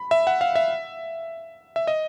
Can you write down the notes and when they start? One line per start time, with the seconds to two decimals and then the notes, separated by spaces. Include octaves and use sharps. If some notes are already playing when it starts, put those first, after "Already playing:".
Already playing: B5
0.11 E5
0.27 F#5
0.41 F5
0.55 E5
1.76 E5
1.87 D#5